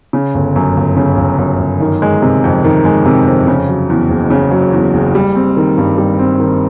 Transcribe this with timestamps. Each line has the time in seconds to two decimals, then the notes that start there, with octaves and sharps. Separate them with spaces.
0.13 C#3
0.35 G1
0.56 F#2
0.77 G1
0.97 C#3
1.17 G1
1.38 F#2
1.59 G1
1.80 D#3
2.02 G#3
2.22 C3
2.44 F2
2.64 D#3
2.85 G#3
3.05 C3
3.26 F2
3.47 C#3
3.68 F#3
3.89 E2
4.10 F#1
4.30 C#3
4.51 F#3
4.73 E2
4.94 F#1
5.15 G3
5.35 C4
5.57 D#3
5.78 G2
5.98 G3
6.19 C4
6.40 D#3